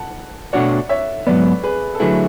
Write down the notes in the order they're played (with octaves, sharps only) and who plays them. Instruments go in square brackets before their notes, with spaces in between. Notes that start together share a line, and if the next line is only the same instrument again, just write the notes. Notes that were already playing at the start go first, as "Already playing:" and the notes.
Already playing: [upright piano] F#5 A5
[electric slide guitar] B2 A3 D4 F#4 C#5 [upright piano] D5 F#5
[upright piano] C#5 E5
[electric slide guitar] G#2 F#3 B3 [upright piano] B4 D5
[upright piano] G#4 B4
A4
[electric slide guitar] D3 F#3 A3 E4 [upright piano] G#4 B4